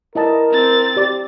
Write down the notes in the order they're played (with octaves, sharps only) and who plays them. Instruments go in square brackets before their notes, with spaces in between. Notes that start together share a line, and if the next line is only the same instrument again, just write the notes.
[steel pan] E4 D#5 A5 [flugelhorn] A#4
[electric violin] C4 A6
[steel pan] G4 D5 D6